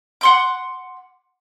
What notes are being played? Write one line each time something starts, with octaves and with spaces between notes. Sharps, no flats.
F#5 C6 D6